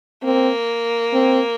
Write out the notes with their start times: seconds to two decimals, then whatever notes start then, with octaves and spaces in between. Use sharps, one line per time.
0.23 A#3 C4
1.14 C4